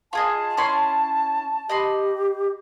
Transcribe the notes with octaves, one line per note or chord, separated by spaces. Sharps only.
F4 G#4 D#5 A5
C#4 E4 C6
G4 D#5 B5 C6